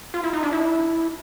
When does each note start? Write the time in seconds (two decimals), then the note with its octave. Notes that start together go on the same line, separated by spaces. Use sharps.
0.14 F4
0.24 E4
0.33 D#4
0.43 D4
0.53 E4